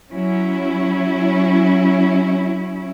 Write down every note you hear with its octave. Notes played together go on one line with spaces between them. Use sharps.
F#3 C#4 E4